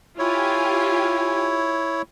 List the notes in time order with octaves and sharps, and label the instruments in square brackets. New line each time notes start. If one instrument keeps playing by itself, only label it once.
[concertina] E4 C#5 [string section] F4 G4 G#5